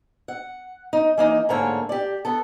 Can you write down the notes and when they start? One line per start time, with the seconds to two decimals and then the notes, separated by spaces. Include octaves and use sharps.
0.28 F#5
0.93 D#4
1.17 E3 A#3 D#4
1.49 G#2 D3 A3 A#3 C#5 G#5
1.89 G4 D5
2.25 B3 A4